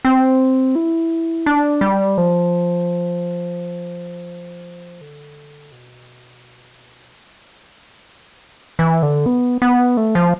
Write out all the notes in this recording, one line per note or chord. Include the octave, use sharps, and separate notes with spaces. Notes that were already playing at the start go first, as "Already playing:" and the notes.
C4
E4
D4
G3
F3
D3
B2
G3
F3
E3
D3
B3
B3
A3
F3